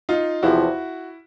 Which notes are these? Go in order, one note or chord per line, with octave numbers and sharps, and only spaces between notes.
D#4 F4
E2 C3 F3 E4 F#4